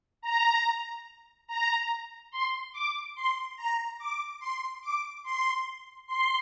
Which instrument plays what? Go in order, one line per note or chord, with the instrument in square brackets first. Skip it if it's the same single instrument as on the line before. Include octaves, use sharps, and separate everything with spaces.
[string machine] A#5
A#5
C6
D6
C6
A#5
D6
C6
D6
C6
C6